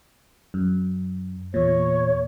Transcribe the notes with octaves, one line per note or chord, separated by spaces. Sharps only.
F#2
E2 A#2 C#5